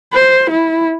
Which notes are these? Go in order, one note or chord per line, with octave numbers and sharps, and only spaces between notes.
C5
E4